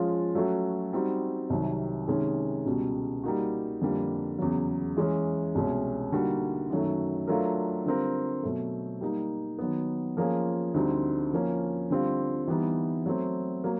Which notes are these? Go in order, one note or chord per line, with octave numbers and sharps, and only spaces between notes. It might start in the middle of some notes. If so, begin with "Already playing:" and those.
Already playing: F3 G#3 C#4 F4
F#3 A3 C#4 F#4
G3 C4 D#4 F#4
C2 C3 D#3 F#3
C3 D#3 G#3 C#4
C#2 B2 G3
G3 A#3 D#4 F#4
F2 D3 G3 A#3
E2 C#3 F#3
E3 G#3 C#4
C2 B2 G#3 C#4
D3 G3 A#3 D#4 F#4
F#2 D#3 F#3 A3
F#3 A3 D4 F4 A#4
D3 G3 C4 F4 A#4
B2 F#3 A3
G3 A#3 D#4
D#3 F#3 B3
F3 A#3 C#4 F4 G#4
D2 D3 G3 C4 D#4
F3 A#3 C#4
D3 G3 C4 F4
E3 G3 B3 D#4
F#3 A3 C4
F#3 A#3